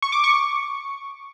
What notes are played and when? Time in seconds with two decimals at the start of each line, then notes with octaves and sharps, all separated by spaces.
0.02 C#6
0.12 D6
0.24 C#6